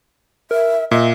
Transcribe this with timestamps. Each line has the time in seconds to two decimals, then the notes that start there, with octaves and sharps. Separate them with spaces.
0.51 A#4 E5
0.91 A#2 D#5 E5